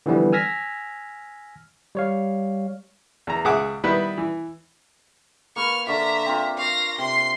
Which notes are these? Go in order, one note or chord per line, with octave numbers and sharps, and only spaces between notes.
D3 E3 F3 G3 B3
G#5 E6 F6 G#6 A#6 B6
G3 C#5 F5
E2 A#5
C#2 G#4 E5 F#5 D6
D#3 G3 B3 E4 B4
E3
A#3 B4 C#6 F6
D3 D5 E5 A#5 C#6
C4 F4
F5 C#6 A#6
C3 C6 C7